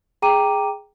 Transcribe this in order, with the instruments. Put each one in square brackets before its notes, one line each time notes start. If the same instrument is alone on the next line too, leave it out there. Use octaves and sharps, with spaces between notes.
[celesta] G#4 G5 A#5 D6 D#7